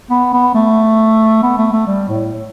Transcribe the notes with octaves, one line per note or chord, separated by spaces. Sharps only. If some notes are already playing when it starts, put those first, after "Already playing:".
B3
B3
A3
B3
A3
A3
G3
A2